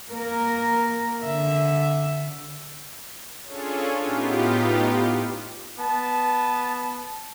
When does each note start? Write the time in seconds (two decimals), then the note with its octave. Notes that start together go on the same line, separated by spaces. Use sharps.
0.12 A#3 A#4
1.25 D3 E5
3.44 C#4 D4 F4 G#4 A4 C#5
3.99 A2 B3 D#4 F4 G4
5.78 B3 A5